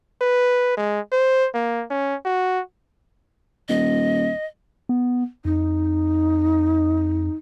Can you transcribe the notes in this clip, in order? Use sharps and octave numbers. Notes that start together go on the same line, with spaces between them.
B4
G#3
C5
A#3
C#4
F#4
D#1 D#5
B3
F2 D#4